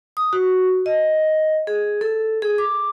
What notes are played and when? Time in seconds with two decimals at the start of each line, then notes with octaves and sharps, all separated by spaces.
0.17 D#6
0.33 F#4
0.86 D#5
1.67 G#4
2.01 A4
2.42 G#4
2.58 D6